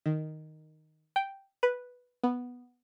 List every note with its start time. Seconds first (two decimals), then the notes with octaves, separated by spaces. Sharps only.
0.06 D#3
1.16 G5
1.63 B4
2.24 B3